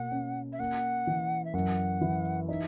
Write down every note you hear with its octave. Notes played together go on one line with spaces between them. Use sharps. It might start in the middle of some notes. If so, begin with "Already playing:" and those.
Already playing: B2 A#3 F#5
C#4
E5
A#3 F#5
E3
E5
F#2 F#5
E3
D#4 E5